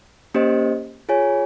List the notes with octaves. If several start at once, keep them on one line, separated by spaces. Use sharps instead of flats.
A#3 C#4 G4 C5 D#5
F4 G#4 C#5 G#5